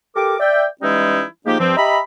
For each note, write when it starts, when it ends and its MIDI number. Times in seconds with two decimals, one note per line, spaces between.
0.16 0.36 67
0.16 0.36 69
0.16 0.36 70
0.16 0.36 86
0.40 0.65 74
0.40 0.65 76
0.40 0.65 79
0.82 1.22 52
0.82 1.22 55
0.82 1.22 56
0.82 1.22 61
0.82 1.22 63
0.82 1.22 64
1.46 1.57 53
1.46 1.57 56
1.46 1.57 58
1.46 1.57 63
1.46 1.57 67
1.60 1.74 43
1.60 1.74 53
1.60 1.74 60
1.77 1.99 67
1.77 1.99 75
1.77 1.99 76
1.77 1.99 82
1.77 1.99 83